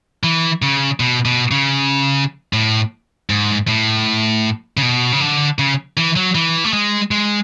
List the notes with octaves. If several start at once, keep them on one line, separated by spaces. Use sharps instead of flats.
E3
C#3
B2
B2
C#3
A2
G#2
A2
C#3
B2
C#3
D3
C#3
E3
F#3
E3
A3
G#3
G#3